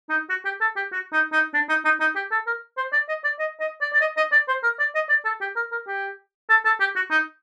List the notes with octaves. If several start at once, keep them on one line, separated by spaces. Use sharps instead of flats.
D#4
F#4
G4
A4
G4
F#4
D#4
D#4
D4
D#4
D#4
D#4
G4
A4
A#4
C5
D5
D#5
D5
D#5
D#5
D5
D5
D#5
D#5
D5
C5
A#4
D5
D#5
D5
A4
G4
A#4
A#4
G4
A4
A4
G4
F#4
D#4